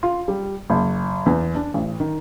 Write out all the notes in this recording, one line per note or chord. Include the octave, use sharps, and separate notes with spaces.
F4
G3
F#1
E2
D4
A1
D#3